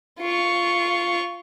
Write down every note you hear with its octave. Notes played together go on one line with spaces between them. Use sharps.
F4 C#6